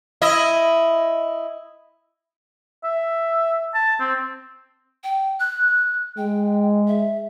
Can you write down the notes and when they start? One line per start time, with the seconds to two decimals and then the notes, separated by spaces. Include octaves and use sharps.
0.22 E4 D#5
2.84 E5
3.74 A5
4.00 C4
5.04 G5
5.40 F#6
6.17 G#3 G5
6.87 E5